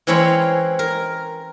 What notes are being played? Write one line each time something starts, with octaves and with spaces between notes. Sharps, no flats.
E3 G#3 C4 C#4 C#5 B5
A#4